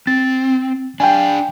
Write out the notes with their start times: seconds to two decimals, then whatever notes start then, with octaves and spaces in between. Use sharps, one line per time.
0.07 C4 A6
1.00 D4 F5 G5 G#5